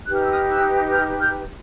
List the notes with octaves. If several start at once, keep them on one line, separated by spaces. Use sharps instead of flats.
D#4 G4 B4 F#6
F6
E6
D#6 F6
E6 F#6
F6 G6
F6 G6